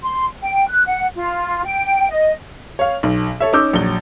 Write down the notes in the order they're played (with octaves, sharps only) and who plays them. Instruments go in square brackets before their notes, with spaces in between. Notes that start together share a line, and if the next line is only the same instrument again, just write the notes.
[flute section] C6
G5
F#6
F#5
F4
G5
D#5
[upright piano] C#5 F5
B1
A4 C#5 E5
C#4 D#4 D6 E6 G6
A#1 F#3 G7